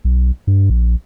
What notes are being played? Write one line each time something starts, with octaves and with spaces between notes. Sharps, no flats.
B1
G2
A#1